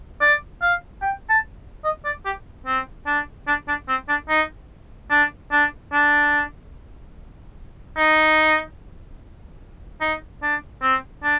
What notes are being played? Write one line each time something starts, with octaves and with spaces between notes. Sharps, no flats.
D5
F5
G5
A5
D#5
D5
G4
C4
D4
D4
D4
C4
D4
D#4
D4
D4
D4
D#4
D#4
D4
C4
D4